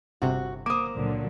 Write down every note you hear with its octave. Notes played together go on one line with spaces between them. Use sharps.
G1 C3 F#4
A#3 C5 D6 D#6
C#2 A#2 D3 F#3